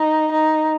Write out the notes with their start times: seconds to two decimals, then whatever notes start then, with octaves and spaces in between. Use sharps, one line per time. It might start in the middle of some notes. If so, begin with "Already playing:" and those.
Already playing: D#4
0.31 D#4